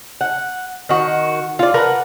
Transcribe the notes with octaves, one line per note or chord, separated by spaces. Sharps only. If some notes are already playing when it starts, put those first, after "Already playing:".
F#5
D#3 F#4
F4 D5
A#4 B4 F#5